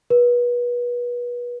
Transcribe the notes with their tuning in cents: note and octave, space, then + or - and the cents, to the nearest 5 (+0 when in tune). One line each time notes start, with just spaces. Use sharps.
B4 -30